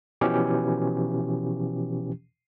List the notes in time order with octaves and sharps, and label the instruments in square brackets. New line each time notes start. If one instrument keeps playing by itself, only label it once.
[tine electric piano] B2 E3 F3 C#4 G4